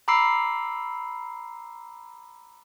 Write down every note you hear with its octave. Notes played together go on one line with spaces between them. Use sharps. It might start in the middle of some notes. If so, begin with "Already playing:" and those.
A#5 B5 D6 E6 C7